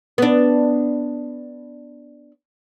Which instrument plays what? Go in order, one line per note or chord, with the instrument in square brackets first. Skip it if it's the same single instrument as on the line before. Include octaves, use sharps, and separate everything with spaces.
[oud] B3 D4